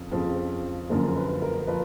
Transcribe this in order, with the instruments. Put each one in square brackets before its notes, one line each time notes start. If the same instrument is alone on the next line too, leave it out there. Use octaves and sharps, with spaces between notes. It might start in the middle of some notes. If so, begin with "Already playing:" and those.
Already playing: [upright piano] F2 C#3 F3
F2 C#3 F3
F#2 D3 F3 A#4
B4
A#4
F3 B4